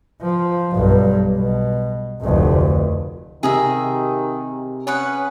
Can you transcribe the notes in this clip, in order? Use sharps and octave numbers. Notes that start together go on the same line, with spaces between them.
F3
B1 G2
B2
F1 D2
C3 D#3 G#4 A#4 E5
C#4 G#4 B4 F#5